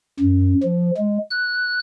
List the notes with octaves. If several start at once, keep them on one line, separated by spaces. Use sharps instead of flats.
F#2
F3
G#3
F#6